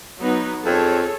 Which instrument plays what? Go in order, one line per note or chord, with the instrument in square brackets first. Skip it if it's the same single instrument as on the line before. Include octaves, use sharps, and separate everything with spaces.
[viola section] F#3 B3 D#4
[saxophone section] F2 [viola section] G#4 A4 C#5